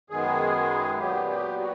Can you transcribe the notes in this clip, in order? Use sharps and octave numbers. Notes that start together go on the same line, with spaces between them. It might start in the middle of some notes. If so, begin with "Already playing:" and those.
F#2 D#3 G#3 B3 G#4
A#2 F#3 B3 G4
G4
F#4